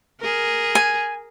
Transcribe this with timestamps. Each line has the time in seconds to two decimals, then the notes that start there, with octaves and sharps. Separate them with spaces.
0.21 G#4 A#4
0.75 G#5